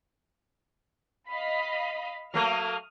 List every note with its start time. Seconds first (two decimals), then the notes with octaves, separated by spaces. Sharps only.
1.28 D#5 F5 B5
2.34 F#3 A3 A#3 D#6 F6